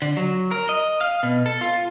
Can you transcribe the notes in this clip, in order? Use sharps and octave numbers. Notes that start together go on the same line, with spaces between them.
D3
F#3
A#4
D#5
F5
B2
A4
F4